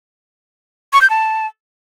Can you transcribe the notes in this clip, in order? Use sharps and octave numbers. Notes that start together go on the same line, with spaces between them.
C#6
G6
A5